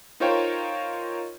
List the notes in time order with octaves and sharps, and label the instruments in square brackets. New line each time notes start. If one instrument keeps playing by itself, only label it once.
[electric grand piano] D#4 F4 A#4 C5 C#5 G5